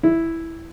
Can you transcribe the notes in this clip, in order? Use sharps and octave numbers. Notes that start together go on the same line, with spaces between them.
E4